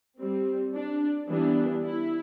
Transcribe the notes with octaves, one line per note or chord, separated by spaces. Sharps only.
G3 C4
D4
E3 G3 B3 D4
E4